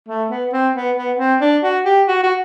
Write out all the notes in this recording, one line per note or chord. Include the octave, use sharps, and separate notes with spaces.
A3
B3
C4
B3
B3
C4
D4
F#4
G4
F#4
F#4